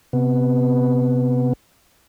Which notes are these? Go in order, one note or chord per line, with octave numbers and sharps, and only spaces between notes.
C3 B3